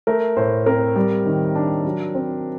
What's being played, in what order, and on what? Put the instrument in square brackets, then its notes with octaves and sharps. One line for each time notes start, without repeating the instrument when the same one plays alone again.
[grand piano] A3 A#4
A2 C5
C4 A#4
G3
D#3
D4
F#3
C4